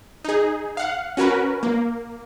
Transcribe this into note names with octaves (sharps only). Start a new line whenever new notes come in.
D#4 G#4
F5 F#5
C#4 F#4 A#4 B4
A#3